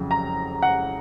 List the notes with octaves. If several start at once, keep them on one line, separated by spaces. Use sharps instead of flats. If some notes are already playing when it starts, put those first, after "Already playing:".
Already playing: F2 C#3 F#3
A#5
F#5